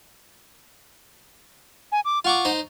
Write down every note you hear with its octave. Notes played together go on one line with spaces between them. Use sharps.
G#5
D6
F4 F#5 C#6 D6
D#4 C5